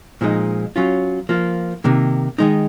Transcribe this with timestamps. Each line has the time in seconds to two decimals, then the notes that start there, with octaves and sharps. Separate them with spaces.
0.21 A#2 F3 G#3 D#4
0.76 F#3 C#4 F4
1.29 F3 A#3 F4
1.84 C3 D#3 A#3
2.38 D#3 G#3 D#4